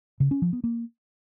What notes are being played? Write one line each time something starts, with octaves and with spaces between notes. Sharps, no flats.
C#3
C#4
F3
B3
A#3